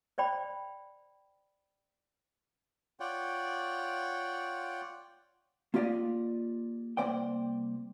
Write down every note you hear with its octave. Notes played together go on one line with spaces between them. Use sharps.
C5 D5 G5 B5
F4 C#5 D5 F#5 G5
A#3 F4 G4 D5 D#5
C2 B2 A#3 C5 D5 G5